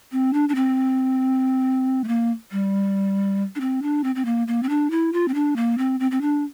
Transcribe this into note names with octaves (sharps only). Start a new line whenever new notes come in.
C4
D4
D4
C4
A3
A#3
G3
D4
C4
D4
C4
C4
A#3
A#3
C4
D4
E4
F4
C4
D4
A#3
C4
C4
C4
D4